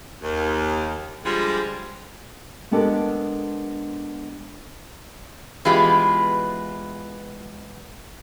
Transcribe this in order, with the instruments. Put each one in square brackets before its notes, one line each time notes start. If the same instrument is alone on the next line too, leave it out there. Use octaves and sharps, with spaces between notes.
[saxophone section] D#2
D3 F3 G3 G#3
[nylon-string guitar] G#3 B3 D4 G4 A4 A#4
[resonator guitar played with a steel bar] E3 G#3 B3 F4 G4